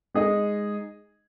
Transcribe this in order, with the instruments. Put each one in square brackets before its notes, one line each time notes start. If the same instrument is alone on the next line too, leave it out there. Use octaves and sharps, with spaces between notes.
[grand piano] G#3 D#4 G#4 D#5